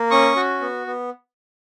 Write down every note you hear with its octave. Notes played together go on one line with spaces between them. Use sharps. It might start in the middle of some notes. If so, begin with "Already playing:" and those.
Already playing: A#3
C#4 C#6 D#6
F#4
B3
B3